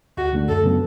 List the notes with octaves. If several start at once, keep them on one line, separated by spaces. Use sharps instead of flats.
D2 F#4
D3 A3 D4
F#2 A4
C#3 F#3 B3